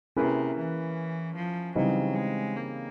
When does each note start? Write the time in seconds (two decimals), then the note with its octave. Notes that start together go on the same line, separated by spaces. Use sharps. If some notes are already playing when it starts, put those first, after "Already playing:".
0.17 C3 A#3 C#4 E4 G#4 B4
0.57 E3
1.36 F3
1.75 C#3 E3 F#3 G3 C4 D#4
2.15 G#3
2.56 A#3